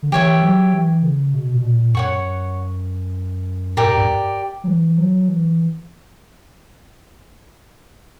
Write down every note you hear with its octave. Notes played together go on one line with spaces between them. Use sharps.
D3
E3 G4 C#5 E5
F#3
E3
C#3
B2
B2
A#2
F#2 C#5 F#5 C#6
A#2 G4 A#4 D5
G2
F#2
G2
F#3
E3
F#3
E3